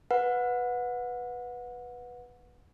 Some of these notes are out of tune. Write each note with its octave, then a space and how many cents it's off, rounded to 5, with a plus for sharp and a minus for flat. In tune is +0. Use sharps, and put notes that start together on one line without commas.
B4 +0 F#5 -25